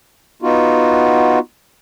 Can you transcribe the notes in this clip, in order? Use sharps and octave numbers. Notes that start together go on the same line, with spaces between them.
B3 D#4 F4 F#4